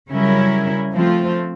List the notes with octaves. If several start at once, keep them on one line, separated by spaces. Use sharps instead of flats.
C#3 F#3 G3 C#4 E4 A#4
F3 A3 C4 F4